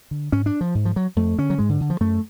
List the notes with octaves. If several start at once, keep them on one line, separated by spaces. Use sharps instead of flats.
D3
G#2 C#4
D4
F3
G#2
F3
F#3
F2 A3
D3 C#4
F#3
G#2 G#3
D3
D3
F3
F#2 A3